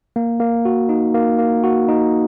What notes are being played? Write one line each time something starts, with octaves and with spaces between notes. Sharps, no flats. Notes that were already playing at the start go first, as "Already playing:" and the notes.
A#3
A#3
F#4
D#4
A#3
A#3
F#4
D#4